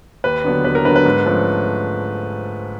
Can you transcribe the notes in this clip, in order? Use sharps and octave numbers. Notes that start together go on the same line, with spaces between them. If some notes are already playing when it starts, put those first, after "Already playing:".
D#2 B4
D3 F#3 B3 D4
D#2 B4
A#4
D3 F#3 B3 D4 B4
B4
G#2
F3 A3 C#4